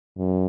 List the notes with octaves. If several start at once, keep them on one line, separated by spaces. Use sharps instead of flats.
F#2